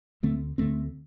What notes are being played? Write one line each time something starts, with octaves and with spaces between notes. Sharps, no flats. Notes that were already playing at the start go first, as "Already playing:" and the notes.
D2 D3 A3 C4
D2 D3 A3 C4